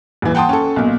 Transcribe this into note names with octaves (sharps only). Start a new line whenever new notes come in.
D#1 E3
F#5 G5 A5 C6 D#6
C#4 A4
B1 A#2